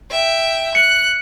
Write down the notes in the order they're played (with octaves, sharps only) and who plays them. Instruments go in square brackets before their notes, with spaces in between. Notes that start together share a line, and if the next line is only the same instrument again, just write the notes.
[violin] E5 G5
[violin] F#6 [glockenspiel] C#7